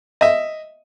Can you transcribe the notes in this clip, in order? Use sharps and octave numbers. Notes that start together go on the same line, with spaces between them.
D#5 E5